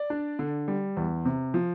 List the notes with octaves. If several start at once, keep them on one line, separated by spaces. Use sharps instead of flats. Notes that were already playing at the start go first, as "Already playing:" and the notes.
Already playing: D5
D4
D3
G3
E2
C3
F3